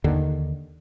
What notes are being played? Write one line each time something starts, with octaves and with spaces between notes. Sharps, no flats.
D#2 D3 D#3